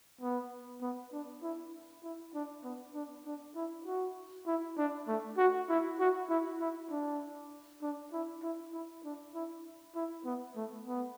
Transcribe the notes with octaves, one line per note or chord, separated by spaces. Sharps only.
B3
B3
D4
E4
E4
D4
B3
D4
D4
E4
F#4
E4
D4
A3
F#4
E4
F#4
E4
E4
D4
D4
E4
E4
E4
D4
E4
E4
B3
A3
B3